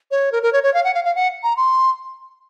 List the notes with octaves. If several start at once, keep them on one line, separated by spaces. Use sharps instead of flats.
C#5
A#4
A#4
C#5
C#5
F5
F#5
F5
F5
F#5
A#5
C6